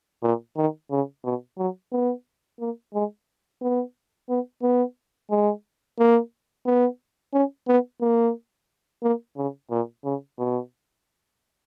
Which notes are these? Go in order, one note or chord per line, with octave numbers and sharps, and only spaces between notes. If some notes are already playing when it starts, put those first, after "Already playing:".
A#2
D#3
C#3
B2
F#3
B3
A#3
G#3
B3
B3
B3
G#3
A#3
B3
C#4
B3
A#3
A#3
C#3
A#2
C#3
B2